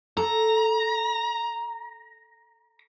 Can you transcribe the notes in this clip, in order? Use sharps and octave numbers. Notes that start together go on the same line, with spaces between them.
A4 A#5